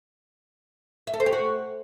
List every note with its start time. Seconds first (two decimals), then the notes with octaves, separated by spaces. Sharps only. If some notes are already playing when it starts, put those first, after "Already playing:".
1.07 E5
1.14 A4
1.20 C5
1.26 G4
1.33 F#4